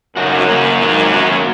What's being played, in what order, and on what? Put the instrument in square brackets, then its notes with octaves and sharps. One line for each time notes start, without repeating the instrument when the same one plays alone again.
[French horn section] F#2 [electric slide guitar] C#3 F#3 D#4 F#4
[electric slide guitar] C#3 A#3 C#4
G#2 D#3 F#3 A#3
F#3 A#3 C#4 F#4 C#5